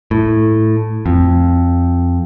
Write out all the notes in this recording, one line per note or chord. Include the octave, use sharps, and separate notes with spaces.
A2
F2